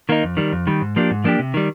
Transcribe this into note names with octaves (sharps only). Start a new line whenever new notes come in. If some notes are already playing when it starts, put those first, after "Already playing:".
D#3 A#3 D#4
F2
D#3 G3
F2
D#3 G3
G#2
F3 A#3 D4 G4
G#2
F3 A#3 D4 G4
C3
D#3 G3